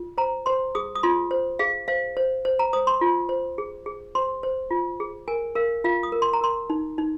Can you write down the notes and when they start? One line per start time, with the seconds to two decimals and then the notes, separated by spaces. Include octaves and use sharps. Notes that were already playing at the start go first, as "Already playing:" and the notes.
Already playing: F4
0.18 C5 A#5
0.46 C5 C6
0.75 G#4 D#6
0.95 D#6
1.03 F4 C6
1.31 C5
1.59 G#4 F5
1.88 C5 F5
2.17 C5
2.45 C5
2.59 A#5
2.73 C5 D#6
2.87 C6
3.01 F4
3.29 C5
3.58 G#4
3.86 G#4
4.15 C5 C6
4.43 C5
4.71 F4
5.00 G#4
5.28 A#4 G#5
5.56 A#4 F5
5.84 F4 F5
6.03 D#6
6.12 A#4
6.22 C6
6.33 A#5
6.41 A#4 C6
6.70 D#4
6.98 D#4